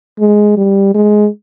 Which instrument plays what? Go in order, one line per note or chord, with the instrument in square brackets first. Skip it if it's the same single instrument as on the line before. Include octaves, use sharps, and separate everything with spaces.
[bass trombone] G#3
G3
G#3